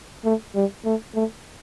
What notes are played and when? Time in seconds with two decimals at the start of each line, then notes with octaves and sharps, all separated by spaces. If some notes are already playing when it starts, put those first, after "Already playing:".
0.25 A3
0.56 G3
0.85 A3
1.15 A3